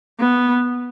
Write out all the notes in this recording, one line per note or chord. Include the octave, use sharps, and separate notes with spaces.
B3